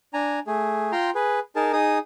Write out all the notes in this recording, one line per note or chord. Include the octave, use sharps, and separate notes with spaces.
D4 G#5 A#5
A3 G#4
F4 G5 A#5 C6
G#4 B4
D#4 G#4 A#4 A5
D#4 G#4 D#6